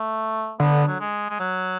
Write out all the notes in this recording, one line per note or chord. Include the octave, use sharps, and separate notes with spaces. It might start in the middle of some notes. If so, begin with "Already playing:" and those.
Already playing: A3
D3 B3
F#3
G#3
G#3
F#3